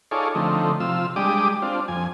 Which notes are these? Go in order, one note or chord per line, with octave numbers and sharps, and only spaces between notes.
D#4 F4 G#4 A4 C#5 D5
D3 F3 A3 C4 D#4
C3 F3 F4 E6
G3 G#3 D4 G4 D6 D#6
C4 D4 F4
F2 G#5